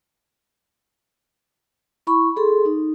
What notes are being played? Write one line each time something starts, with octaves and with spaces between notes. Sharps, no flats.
E4 B5 C#6
G#4 A4 C6
D#4